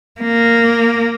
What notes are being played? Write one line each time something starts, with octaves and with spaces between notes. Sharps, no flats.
A#3